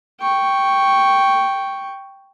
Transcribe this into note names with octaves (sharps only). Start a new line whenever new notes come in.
G5 C#6